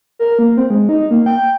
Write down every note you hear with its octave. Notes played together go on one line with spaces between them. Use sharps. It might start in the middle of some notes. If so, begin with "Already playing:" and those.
A#4
A#3
C4
G#3
D#4
A#3
G5